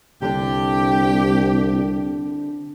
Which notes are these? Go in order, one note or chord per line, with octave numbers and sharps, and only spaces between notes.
C2 D3 D4 G4